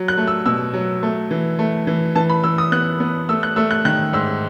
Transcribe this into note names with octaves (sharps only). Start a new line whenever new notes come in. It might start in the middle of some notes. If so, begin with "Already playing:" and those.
Already playing: F#3
F#6
A3
E6
B2 E6
F#3
A3
E3
A3
E3
E3 A5
B5
E3 E6
D#6
B3 F#6
B3
A3 E6
F#6
A3 E6
F#6
D#3 F#6
G#2 E6